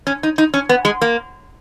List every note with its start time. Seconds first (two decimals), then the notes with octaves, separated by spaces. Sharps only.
0.07 C#4
0.23 D#4
0.38 D#4
0.54 C#4
0.69 B3
0.85 G#3
1.02 A#3